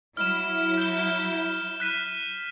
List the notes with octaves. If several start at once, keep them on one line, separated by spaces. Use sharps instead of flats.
F#3 E4 F6 E7
G6 E7 G7
F#6 B6 D#7